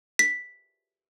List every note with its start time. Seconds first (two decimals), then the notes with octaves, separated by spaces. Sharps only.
0.19 B6